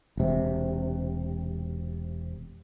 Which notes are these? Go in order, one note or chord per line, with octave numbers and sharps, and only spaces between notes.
E1 C3